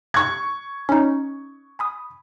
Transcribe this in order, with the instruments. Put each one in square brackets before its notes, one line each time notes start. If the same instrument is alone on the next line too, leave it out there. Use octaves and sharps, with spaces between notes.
[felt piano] C#6 G#6 [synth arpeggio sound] F#6
[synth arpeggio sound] C#4 D#4
G#5 B5 D#6